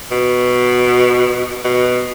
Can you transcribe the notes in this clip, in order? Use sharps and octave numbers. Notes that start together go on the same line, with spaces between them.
B2
B2